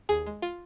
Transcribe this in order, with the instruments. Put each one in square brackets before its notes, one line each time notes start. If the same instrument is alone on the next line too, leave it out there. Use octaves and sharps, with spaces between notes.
[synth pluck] D#2 G#4
G#3
F4